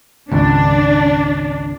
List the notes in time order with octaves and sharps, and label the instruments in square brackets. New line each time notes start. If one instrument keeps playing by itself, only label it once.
[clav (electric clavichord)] G#1 C#2 [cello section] D4